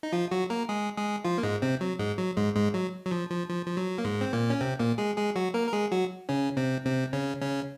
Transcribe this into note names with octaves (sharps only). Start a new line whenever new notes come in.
D#4
F3 F4
F#3 F#4
A#3 A#4
G#3 G#4
G#3 G#4
F3 F4
A#3
G#2 G#3
C3 C4
F#3
G#2 G#3
F#3
G#2 G#3
G#2 G#3
F#3
F#3
F3
F3
F3
F3
F#3
A#3
G#2 G#3
C4
A#2 A#3
C#4
C3 C4
A#2 A#3
G#3 G#4
G#3 G#4
F#3 F#4
A#3 A#4
A#4
G#3 G#4
F#3 F#4
C#3 C#4
C3 C4
C3 C4
C#3 C#4
C#3 C#4